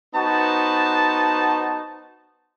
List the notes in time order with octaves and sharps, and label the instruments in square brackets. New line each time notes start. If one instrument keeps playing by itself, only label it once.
[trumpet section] B3 D#4 F#4 C5 A5